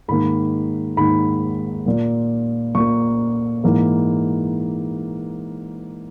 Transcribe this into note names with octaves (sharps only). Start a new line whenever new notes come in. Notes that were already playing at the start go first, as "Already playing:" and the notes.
G#2 D#3 A#3 B5
G#2 D#3 A#3 B5
A#2 A#3
A#2 A#3 C#6
G#2 E3 A#3